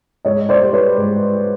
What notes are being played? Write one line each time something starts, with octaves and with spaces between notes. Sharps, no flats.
G#2 C#5 D#5
C5 D5
G3
B4 C#5
G#2